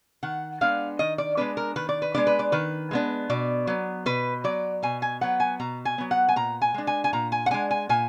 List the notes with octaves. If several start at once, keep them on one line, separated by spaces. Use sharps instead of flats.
D#3 F#5
G#3 B3 D4 F5
D#3 D#5
D5
G#3 B3 D4 B4
A#4
D#3 B4
D5
B4
G#3 B3 D4 D5
B4
D5
D#3 B4
G#3 B3 D4
B2 D5
F#3 B3
B2 B4
F#3 B3 D5
B2 G#5
G#5
F#3 B3 F#5
G#5
B2 A#5
G#5
F#3 B3
F#5
G#5
A#2 A#5
G#5
G#3 D4
G#5
G#5
A#2 A#5
G#5
F#5
G#3 D4 G#5
G#5
A#2 G#5